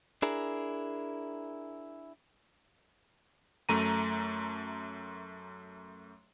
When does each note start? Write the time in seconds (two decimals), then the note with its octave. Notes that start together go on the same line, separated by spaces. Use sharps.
0.22 D4 E4 G#4 A#4
3.69 F#2 A3 A#5 D#7